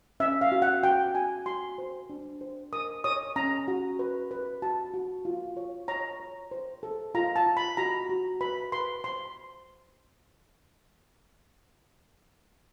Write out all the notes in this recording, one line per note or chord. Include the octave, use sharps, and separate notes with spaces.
C#4 E5
F5
F#4
F#5
F#4 G5
F#4 G#5
F#4 C6
C5
D4
C5
A#4 D#6
C#5 D#6
C#4 A#5
F#4
B4
B4
F#4 A5
F#4
F4
C#5
C#5 A#5
C#5
C5
A4
F4 A#5
A5
F4
B5
F#4 A#5
F#4
B4 B5
B4 C6
C5 C6